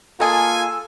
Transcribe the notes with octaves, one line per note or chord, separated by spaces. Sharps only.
G#3 A#3 F4 G#4 A4 G#5